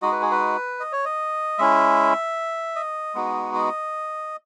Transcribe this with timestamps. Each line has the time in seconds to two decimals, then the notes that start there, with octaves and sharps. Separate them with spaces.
0.02 G#3 D#4 F#4 D#5
0.12 B4
0.22 G#4
0.31 B4
0.80 D#5
0.92 C#5
1.05 D#5
1.59 G#3 C#4 E4 E5
2.76 D#5
3.15 G#3 B3 D#4 F#4
3.54 D#5